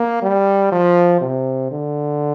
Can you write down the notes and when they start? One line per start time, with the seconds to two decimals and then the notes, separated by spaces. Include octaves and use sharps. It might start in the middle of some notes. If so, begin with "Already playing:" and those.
Already playing: A#3
0.22 G3
0.72 F3
1.21 C3
1.71 D3